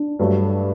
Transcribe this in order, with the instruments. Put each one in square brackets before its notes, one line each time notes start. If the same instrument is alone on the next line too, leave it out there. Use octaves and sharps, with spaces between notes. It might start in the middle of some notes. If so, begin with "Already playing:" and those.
Already playing: [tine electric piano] D4
[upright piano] G2 F#3 A3